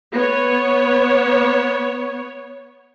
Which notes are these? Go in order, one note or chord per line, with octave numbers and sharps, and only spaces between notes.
B3 C#5